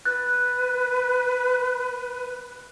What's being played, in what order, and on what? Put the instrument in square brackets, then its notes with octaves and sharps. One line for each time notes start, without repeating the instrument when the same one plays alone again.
[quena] B4 [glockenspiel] F#6 A6